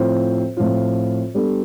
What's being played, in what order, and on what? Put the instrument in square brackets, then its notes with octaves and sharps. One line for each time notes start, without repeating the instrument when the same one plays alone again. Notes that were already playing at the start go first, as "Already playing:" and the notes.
Already playing: [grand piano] A2 F3 C4 F4 C5
A2 F3 C4 F4 C5
G3 B3 D4 A4